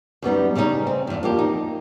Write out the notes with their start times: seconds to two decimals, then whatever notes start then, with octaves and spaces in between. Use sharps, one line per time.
0.22 F#2 G3 B3 D#4
0.55 C#3 G3 C#4 D#4
0.87 C4
1.07 E2 G2
1.23 F2 A#3 G4
1.39 D#4